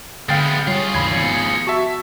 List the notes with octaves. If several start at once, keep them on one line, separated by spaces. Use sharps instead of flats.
D3 G#3 B3 F5 G5 A6
G3 F4 G#4 C#5
G#1 D#2 C#3 E3 B5 G#6
D#3 F3 B3 C#7
F#4 E5 A5 C#6